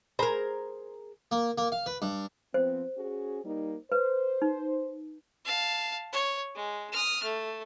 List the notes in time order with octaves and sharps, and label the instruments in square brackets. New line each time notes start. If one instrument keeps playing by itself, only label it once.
[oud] G#4 A#4 [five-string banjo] C5 A#5 B5
[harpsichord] A#3
A#3
F5
B4
G2
[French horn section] F3 B3 C4 [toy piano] C5
[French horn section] C#4 F#4 G#4
G3 A#3 D#4
[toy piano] B4 [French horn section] C5
[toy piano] D#4
[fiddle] F5 A5
C#5
G#3
D#6 F6
A3